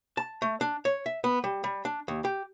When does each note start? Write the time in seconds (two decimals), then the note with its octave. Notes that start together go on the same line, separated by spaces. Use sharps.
0.17 A5
0.42 A3
0.61 D4
0.85 C#5
1.06 E5
1.24 B3
1.44 G3
1.64 G3
1.85 D4
2.08 D#2
2.25 G4